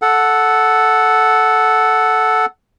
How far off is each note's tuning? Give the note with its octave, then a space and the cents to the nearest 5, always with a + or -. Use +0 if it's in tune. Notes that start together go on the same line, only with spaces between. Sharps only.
A4 -5 F#5 +0